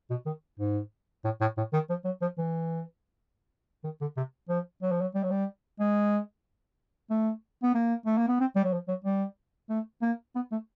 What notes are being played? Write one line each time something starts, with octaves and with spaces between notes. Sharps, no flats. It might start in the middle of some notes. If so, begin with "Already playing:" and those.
B2
D#3
G#2
A2
A2
A2
D#3
F3
F#3
F3
E3
D#3
D3
C3
F3
F#3
F3
F#3
G3
F#3
G3
G#3
A3
B3
A#3
A3
A#3
B3
C4
G3
F#3
F3
F#3
G3
A3
A#3
B3
A3